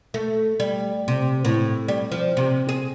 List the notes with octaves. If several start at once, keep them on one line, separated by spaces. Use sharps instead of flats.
A3
G3
C3
A2
G3
F3
C3
G#4